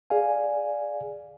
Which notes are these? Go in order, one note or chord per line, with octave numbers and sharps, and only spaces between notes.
G#4 D5 F5 G#5